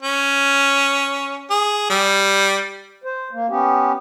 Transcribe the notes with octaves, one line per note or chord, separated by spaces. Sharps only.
C#4
G#4
G3
C5
A#3
B3 C#4 G4